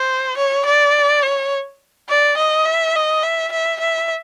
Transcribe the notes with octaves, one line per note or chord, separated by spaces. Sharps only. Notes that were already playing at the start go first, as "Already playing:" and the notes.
Already playing: C5
C#5
D5
C#5
D5
D#5
E5
D#5
E5
E5
E5